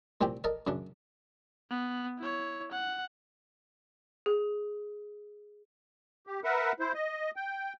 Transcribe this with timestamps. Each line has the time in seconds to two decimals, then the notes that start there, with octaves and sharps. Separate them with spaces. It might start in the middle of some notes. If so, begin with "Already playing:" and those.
0.21 C2 A#2 C4 G4 G5
0.44 A4 A#4 D5 D#5
0.67 F#2 C#3 D4
1.70 B3
2.18 E4 C#5
2.71 F#5
4.26 G#4
6.27 G4
6.44 A#4 B4 E5 F#5
6.80 E4 C5
6.94 D#5
7.36 G5